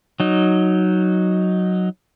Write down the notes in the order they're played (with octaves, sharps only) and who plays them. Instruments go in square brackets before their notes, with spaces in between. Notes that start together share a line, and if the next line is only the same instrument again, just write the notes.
[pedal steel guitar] F#3 D#4